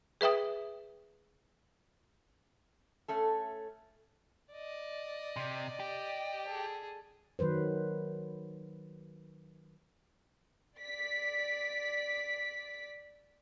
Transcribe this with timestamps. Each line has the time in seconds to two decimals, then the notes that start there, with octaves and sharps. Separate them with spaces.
0.21 G#4 B4 E5 G5 D#6
3.08 A3 C#4 A4
4.54 D5 D#5
5.36 C3
5.80 G4
6.48 G#4 A4
7.39 D#3 F#3 B4 C5
10.77 D5 B6